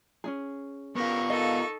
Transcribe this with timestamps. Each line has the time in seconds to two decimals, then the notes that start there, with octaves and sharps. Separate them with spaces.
0.24 C#4 D4 G#4
0.96 B3 F4 A#4 C#6
1.30 D#4 A4 A#4 D#5 F5